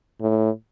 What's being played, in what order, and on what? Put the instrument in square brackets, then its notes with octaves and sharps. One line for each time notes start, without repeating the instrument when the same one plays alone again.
[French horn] A2